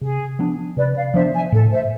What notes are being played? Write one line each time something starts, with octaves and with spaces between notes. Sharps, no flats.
C3 G#4
F3 B3 D4
C3 B4 D5
D5 F5
F3 B3 D4 C5 E5
E5 G#5
A2 A4
C5 E5